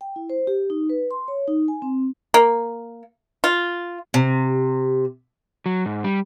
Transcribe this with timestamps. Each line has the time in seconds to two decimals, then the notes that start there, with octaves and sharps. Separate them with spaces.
0.01 G5
0.16 E4
0.30 C5
0.47 G4
0.70 D#4
0.89 B4
1.11 C6
1.28 C#5
1.48 D#4
1.68 G#5
1.82 C4
2.34 A#3
3.44 F4
4.14 C3
5.66 F#3
5.86 G#2
6.04 G3